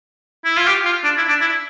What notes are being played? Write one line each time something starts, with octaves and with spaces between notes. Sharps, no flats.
E4
F4
G4
F4
D4
E4
D4
E4